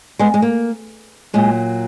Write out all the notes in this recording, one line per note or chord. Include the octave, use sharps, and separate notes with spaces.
G#3 B3
G#3
A#3
A#2 F#3 G#3